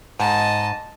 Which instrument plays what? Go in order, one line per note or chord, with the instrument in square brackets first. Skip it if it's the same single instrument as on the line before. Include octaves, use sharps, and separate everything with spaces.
[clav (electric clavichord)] G#2 [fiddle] D#5 A5